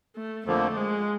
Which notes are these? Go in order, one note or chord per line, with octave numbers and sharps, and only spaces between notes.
A3
F2 D3 F3 A3 A#3
G#3